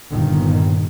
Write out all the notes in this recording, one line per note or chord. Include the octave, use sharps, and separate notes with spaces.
G1 A#2 D#3